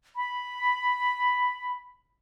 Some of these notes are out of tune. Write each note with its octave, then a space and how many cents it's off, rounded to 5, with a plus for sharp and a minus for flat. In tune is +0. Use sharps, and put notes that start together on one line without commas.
B5 +0